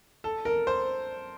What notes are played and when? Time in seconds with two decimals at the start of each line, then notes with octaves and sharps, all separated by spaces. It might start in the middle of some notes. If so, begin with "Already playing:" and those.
0.24 A4
0.45 A#4
0.67 C5